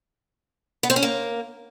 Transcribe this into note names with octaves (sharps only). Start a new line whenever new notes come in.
B3
C4
C#4
A#3